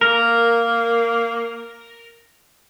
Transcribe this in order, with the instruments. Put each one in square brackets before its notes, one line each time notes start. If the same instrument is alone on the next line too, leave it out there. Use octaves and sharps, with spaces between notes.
[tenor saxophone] A#3 [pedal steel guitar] A#4